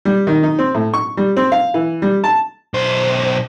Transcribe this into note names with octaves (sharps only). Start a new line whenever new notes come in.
G3
D#3
D#4
C4
A2
C#6
G3
C4
F5
E3
G3
A5
B1 C5